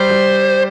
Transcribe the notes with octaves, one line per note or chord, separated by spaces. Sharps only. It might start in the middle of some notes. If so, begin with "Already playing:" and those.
Already playing: G3 C5
G3